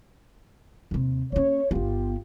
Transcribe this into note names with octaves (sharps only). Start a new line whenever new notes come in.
D#2 C3
A#3 C#4 C#5
G1 B3 F4 G4